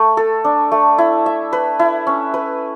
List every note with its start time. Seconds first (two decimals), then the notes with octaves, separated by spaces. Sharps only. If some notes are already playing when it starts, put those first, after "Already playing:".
Already playing: A3
0.17 A4
0.45 D4
0.72 A3
0.98 E4
1.26 E5
1.53 B4
1.80 E4
2.07 C#4
2.34 B4